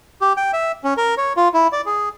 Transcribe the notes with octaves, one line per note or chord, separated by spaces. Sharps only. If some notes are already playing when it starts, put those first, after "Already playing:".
G4
G5
E5
C#4
A#4
C#5
F4
E4
D5
G#4